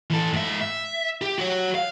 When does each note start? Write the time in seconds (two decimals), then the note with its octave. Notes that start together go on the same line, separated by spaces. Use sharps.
0.10 E3 A4
0.33 G#2 E5
0.61 E5
1.21 G4
1.38 F#4 C#5
1.75 F5